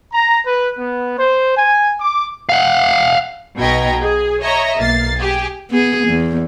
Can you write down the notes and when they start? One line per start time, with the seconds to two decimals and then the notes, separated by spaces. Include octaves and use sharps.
0.13 A#5
0.45 B4
0.79 B3
1.17 C5
1.57 G#5
2.00 D6
2.49 F5 F#5
3.58 B1 B2 D#5 G5 A#5 G#6
4.00 G#4
4.42 C#5 D#5 E5 A#5
4.78 B1 A#3 A6 C7
5.17 G4 G#4
5.71 B3 G#4
6.09 E2